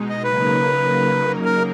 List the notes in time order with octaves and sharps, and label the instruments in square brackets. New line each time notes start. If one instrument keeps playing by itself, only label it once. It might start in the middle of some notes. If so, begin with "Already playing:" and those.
Already playing: [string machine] B2 G#3 D#4
[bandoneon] D#5
[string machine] C#3 F#3 A#3 D#4 A#4 [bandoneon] B4
[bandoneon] A#4